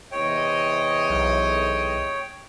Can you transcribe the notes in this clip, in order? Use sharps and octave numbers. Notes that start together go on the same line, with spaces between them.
E2 C3 C#5 D#5 G5
B1